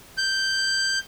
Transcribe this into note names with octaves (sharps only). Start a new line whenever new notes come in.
G6